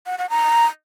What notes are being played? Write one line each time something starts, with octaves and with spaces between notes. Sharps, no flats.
F#5
F#5
A#5